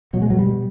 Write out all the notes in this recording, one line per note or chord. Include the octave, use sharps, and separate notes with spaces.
B2 F#3
G#3
B2 F#3
G3
B2